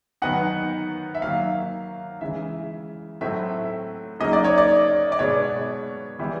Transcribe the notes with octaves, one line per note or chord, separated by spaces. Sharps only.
D#3 F#3 B3 D#4 F#5
E5
D#3 F#3 A#3 F5
C#3 E3 G#3 E5
A2 F#3 A3 C4 E4 E5
C#3 F#3 A#3 D#4 D#5
D5
C#5
D5
D5
B2 G#3 B3 C#5
E3 G3 B3 E4